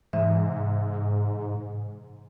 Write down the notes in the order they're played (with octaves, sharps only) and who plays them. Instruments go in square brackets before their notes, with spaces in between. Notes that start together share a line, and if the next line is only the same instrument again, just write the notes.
[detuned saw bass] G#2 [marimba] C3 E3 E5